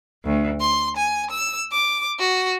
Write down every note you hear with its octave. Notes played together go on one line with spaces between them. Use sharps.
D2
C6
G#5
E6
D6
F#4